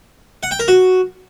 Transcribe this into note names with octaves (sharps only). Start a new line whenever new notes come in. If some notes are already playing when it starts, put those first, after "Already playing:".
F#5
G5
A#4
F#4